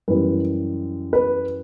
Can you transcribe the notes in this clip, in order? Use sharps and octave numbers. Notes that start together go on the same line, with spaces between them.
F#2 E3 G3 B4
B4